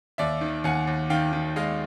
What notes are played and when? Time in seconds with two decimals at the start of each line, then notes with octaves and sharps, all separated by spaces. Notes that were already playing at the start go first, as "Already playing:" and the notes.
0.18 D#2 D5 E5
0.41 D#3
0.64 D#2 F#5 G#5
0.87 D#2
1.10 D#3 F5 G5
1.33 D#3
1.56 G#3 D#5 F5